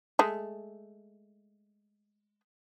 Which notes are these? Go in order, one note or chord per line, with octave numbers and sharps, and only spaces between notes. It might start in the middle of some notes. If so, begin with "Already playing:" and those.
G#3 A3